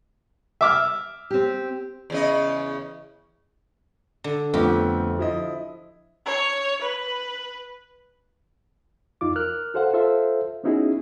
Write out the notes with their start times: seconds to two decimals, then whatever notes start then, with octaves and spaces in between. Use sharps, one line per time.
0.61 E5 D6 F6
1.30 C4 G4
2.10 E2 C#3 D#5
4.24 D3
4.54 F2 A3 B3 G4
5.19 F3 E4 D#5
6.26 C#5
6.82 B4
9.21 F2 D#4 F4 D6
9.36 A#4 F6 F#6
9.74 F#4 A4 C5 F5 F#5
9.93 F4 A4 C5 E5 F5
10.64 B3 C#4 D#4 E4 F#4 G#4